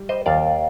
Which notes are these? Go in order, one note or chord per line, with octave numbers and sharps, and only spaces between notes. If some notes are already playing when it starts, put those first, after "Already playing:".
Already playing: G3
C5 D#5
D#2 D5 F5